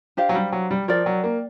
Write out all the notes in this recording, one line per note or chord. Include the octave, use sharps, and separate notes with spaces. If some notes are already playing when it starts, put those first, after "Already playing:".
D4 G4 C5 F5
F#3
G3
F#3
G3
F3 A#4 D5 G5
F#3
A#3